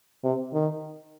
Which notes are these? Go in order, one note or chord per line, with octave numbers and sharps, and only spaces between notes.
C3
D#3